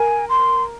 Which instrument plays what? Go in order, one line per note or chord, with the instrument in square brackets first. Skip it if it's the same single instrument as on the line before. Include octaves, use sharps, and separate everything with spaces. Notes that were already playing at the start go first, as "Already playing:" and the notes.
Already playing: [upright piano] A#4 [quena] G#5
[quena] C6